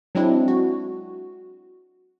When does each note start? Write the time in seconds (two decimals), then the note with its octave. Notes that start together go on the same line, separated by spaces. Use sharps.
0.15 F#3 G#3 C4 D4 E4
0.48 F#4